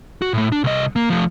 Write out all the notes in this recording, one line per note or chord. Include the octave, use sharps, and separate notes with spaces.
F#4
A2 A3
D4
C2 D#5
A#3
F3 A3